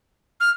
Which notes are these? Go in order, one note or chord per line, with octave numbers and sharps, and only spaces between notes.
F6